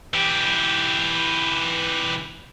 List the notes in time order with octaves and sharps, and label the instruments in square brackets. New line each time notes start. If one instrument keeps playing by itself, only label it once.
[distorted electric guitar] E3 G4